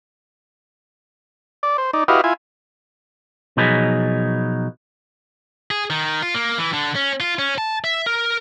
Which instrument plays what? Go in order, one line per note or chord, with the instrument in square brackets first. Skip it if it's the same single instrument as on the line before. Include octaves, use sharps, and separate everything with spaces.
[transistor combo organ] D5
C5
D#4 D5
E4 F#4 G4 B4 D#5 F5
E4 F4 G#5
[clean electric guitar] B2 F3 F#3 D#4 G#4 B4
[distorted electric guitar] G#4
D#3
F4
A#3
E3
D3
C#4
F4
C#4
A5
E5
A#4